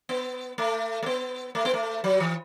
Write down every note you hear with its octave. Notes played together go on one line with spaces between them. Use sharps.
B3
A3
A3
B3
A3
B3
A3
F#3
E3